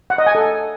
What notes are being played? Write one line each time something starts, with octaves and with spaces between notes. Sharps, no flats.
F#5
D#5
G#5
A4